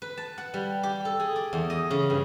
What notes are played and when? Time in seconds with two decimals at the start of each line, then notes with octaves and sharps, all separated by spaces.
0.02 B4
0.17 A5
0.38 F#5
0.54 G3
0.83 G4
1.05 A4
1.20 G#4
1.36 D5
1.53 E2
1.70 D#5
1.91 C#3
2.10 G2